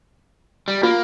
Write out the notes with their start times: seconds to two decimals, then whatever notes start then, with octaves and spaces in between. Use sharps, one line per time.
0.68 G3
0.83 A#3 F4